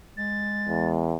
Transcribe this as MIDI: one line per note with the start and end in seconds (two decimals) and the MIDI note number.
0.17 1.12 56
0.17 0.88 93
0.68 1.17 40